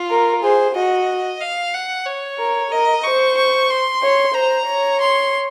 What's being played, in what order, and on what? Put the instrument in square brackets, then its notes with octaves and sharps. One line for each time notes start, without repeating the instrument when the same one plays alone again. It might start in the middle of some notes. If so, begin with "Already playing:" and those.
Already playing: [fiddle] F4
[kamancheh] A#4
[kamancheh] G#4 [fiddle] C5
[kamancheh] F#4 [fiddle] D#5
[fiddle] F5
F#5
C#5
[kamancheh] A#4
[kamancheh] A#4 [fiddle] D#5
[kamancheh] C5 [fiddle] C#6
[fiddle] C#6
C6
[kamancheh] C#5
[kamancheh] C5 [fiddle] A#5
[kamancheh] C#5
[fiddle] C6